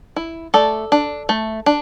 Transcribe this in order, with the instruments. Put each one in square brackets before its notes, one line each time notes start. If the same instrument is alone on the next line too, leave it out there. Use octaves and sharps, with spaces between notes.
[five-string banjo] E4
A3 A4 D5
D4
A3
D4